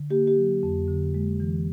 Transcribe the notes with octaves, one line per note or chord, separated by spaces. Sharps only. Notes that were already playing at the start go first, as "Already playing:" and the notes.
Already playing: D3
A#3 G4
G4
F#3
F2
D3
G#3
E3